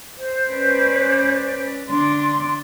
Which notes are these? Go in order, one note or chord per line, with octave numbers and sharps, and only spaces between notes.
C5
C#4 B4 D5
D3 D4 C6